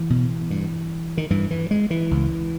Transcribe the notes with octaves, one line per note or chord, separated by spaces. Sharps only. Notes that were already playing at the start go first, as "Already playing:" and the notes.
Already playing: E3
B2
G2
D#3
G2 E3
E3
G#3
E3
C#2